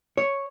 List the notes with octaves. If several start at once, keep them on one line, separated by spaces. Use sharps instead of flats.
C#5